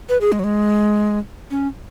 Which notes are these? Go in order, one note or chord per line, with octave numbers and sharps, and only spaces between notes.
B4
G#4
G#3
F#3
G#3
C#4